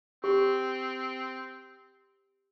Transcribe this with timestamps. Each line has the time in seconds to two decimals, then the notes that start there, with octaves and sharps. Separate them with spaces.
0.24 C4 G4